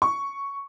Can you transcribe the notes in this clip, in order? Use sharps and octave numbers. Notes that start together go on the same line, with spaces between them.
C#6